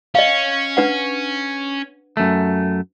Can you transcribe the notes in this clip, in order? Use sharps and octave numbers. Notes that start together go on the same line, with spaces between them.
C#4 D#5 F5
D4 B4 F#5
F#2 A3